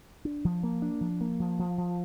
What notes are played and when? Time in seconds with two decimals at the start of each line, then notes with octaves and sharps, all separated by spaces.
0.25 D4
0.45 F3
0.63 A#3
0.82 D4
1.01 F3
1.21 A#3
1.40 F3
1.59 F3
1.78 F3